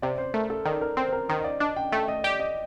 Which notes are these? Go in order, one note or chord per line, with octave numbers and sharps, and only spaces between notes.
C3 D5
C5
A3 A#4
A4
D#3 D5
A#4
C4 C5
C5
A#4
D#3 C5
D#5
D5
D4 D#5
G5
A3 G5
D#5
G4 D5
D#5